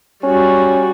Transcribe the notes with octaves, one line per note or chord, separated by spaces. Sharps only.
G3 C#4 F#4